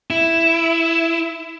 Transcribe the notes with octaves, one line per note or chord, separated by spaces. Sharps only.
E4